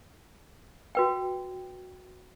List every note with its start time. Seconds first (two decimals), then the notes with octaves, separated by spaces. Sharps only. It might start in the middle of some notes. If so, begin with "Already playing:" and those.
0.95 F#4 B4 G5